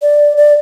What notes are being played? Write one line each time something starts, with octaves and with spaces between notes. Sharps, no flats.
D5
D5